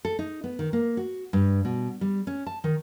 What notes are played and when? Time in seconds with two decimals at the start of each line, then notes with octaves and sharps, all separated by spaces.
0.05 A4
0.19 D#4
0.44 B3
0.59 D#3
0.73 A#3
0.97 F#4
1.33 G2
1.65 B2
2.01 G3
2.27 C#4
2.47 A5
2.64 D#3